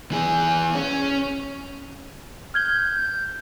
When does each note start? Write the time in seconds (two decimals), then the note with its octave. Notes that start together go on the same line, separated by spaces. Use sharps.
0.12 E3 G#4
0.75 C#4
2.54 F6 G6 G#6 G7